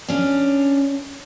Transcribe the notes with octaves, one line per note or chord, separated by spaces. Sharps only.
C#4 D4